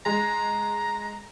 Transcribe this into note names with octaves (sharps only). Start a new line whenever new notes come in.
G#3 A#5